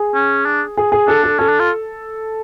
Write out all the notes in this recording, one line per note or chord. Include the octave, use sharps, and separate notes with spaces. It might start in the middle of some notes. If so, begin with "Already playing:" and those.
Already playing: G#4
C#4
D4
G#4
G#4
D4 A4
A4
C#4 A4
D4
F4